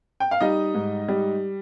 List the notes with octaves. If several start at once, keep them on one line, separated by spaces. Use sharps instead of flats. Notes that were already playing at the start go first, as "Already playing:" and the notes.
G5
F5
G3 D#4 D#5
G#2
G3